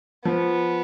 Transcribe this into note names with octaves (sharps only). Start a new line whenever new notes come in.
F3 B3